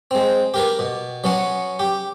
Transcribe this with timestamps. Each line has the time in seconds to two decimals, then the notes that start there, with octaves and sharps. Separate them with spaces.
0.11 G#3 C4
0.54 G4 A#4 B4
0.79 B2
1.24 F#3 B3 C#4 F#5
1.79 G4